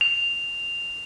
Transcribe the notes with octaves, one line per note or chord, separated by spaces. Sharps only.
F7